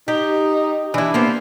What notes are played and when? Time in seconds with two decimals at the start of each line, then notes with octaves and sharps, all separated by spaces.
0.08 D#4 G4
0.94 E3 D4 E4
1.14 A#3 B3 C5